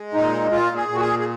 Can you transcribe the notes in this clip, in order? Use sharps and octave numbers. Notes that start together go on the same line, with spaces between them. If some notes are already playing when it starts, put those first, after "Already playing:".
Already playing: G#3
A#2 D#4
A#2 F4
G#4
A#2
F#4
G#4
G#4